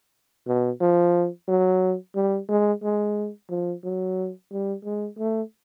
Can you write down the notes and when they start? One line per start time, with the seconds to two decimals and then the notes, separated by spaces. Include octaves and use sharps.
0.47 B2
0.81 F3
1.48 F#3
2.15 G3
2.49 G#3
2.83 G#3
3.50 F3
3.84 F#3
4.51 G3
4.85 G#3
5.18 A3